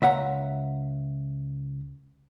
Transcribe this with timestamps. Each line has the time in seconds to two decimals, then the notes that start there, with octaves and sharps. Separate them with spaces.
0.02 C#2 E5 F#5 A#5